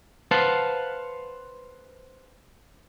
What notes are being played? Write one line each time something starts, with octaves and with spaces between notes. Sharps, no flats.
B4 C5 F5 F#5 A5